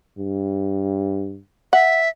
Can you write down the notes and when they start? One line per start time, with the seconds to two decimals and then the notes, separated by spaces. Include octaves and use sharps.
0.18 G2
1.73 E5 F#5